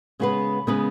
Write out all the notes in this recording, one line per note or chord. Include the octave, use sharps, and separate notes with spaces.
C#3 G#3 B3 G#4 B4
C#3 G#3 B3 G#4 B4